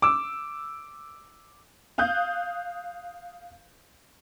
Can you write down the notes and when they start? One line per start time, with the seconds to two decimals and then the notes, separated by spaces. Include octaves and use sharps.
0.02 D6 E6
1.98 F5 D#6 F#6 G6